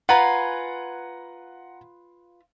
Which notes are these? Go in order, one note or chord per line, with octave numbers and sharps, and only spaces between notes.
F4 B4 F#5 G#5 A#5